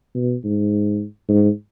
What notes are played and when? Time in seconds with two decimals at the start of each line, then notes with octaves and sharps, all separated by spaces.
0.15 B2
0.44 G#2
1.29 G#2